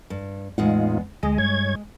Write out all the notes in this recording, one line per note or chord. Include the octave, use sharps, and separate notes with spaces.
G2
E2 A2 G#3 D#4 F4 F#5
D2 G#3 G#4 D#5
G2 C#5 G#6